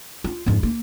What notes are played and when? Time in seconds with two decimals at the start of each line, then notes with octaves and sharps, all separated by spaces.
0.24 F4
0.46 F2 G#2
0.63 A#3